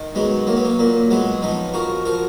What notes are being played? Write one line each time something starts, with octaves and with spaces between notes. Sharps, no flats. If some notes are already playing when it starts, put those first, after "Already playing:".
Already playing: D#3
F#3 G#3 B3
F#3 A#3
B3
A#3
A#2 A#3
F#3 G#3 B3
F3 B3 D#4
F3 F#4 A#4
F3 F#4 A#4